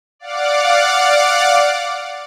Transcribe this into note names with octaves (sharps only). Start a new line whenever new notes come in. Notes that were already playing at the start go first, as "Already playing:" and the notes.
D5 F5 F#5 D6